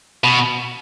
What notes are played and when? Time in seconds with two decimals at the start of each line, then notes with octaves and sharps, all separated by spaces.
0.24 B2